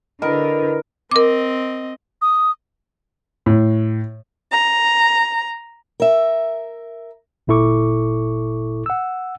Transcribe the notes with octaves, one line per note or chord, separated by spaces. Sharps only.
D3 E4 A#4 B4 D#5 B5
C4 A#4 D#5 D6
D#6
A2
A#5
A#4 E5
G1 A#2 E4 A4 C#6 D6
F#5 E6